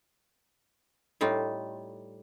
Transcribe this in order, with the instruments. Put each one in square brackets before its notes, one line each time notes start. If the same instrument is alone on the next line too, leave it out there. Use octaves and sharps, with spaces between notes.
[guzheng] A2 G3 D#4 F4